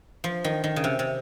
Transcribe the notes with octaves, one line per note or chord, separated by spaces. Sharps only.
F3
D#3
D#3
C#3
C3
C3